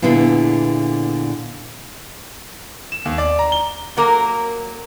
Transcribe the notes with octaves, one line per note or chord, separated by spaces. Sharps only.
A#2 D3 B3 E4 G#4
E7
D#2
D5
A#5
G7
F#3 A#3 A#4